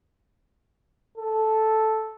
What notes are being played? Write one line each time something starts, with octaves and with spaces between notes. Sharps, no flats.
A4